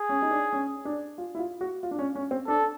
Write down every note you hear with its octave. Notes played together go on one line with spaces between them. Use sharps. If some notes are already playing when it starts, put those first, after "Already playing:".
Already playing: G#4
C#4
D#4
D4
C#4
D4
F4
E4
F4
F#4
F4
D4
C#4
C#4
C4
D4 A4